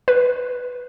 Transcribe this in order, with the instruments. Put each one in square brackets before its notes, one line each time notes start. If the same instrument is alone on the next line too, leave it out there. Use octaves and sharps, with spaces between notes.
[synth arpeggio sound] B4